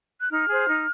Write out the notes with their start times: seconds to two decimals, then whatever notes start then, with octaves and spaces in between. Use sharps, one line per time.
0.20 F#6
0.31 D#4 F6
0.48 G#4 C5
0.67 D#4